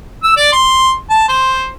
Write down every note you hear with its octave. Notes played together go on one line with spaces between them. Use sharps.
E6
D5
C6
A5
C5